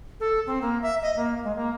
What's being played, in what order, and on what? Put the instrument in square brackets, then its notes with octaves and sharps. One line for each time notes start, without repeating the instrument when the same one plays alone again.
[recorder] A4
C4
A#3
E5
D#5
A#3
G#3
A#3